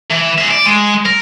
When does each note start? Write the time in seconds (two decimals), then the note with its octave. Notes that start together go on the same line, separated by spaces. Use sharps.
0.10 E3
0.38 G#4 E5
0.51 D5
0.66 G#3
1.05 A#4